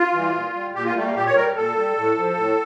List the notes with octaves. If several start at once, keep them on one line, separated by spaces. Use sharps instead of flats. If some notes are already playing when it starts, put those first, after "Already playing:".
Already playing: F4
E3 G3
A#2
G3
A#2 G4
F4
G3 A3
A#3
A#2 G4
C#5
G3 A#4
A#2 A4
G3
A2
F3
A2